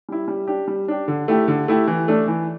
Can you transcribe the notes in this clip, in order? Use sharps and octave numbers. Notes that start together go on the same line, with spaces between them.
G3 E4
G3
D4 G4
G3
D4 G4
D3
A3 E4 G4
D3
A3 E4 G4
E3
A3 D4
E3